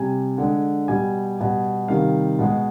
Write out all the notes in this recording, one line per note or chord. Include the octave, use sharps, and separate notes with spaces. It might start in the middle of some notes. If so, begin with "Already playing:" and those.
Already playing: C3 G3 G#5
D3 G#3
B2 G3 G#5
B2 G3
C3 D#3 G3 F5
B2 G#3